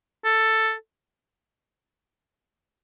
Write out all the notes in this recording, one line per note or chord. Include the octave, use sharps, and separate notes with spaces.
A4